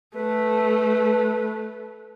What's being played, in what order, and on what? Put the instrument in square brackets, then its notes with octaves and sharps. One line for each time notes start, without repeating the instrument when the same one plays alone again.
[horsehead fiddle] A3 [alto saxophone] B4